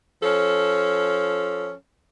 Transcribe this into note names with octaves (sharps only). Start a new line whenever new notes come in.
F3 C#4 A4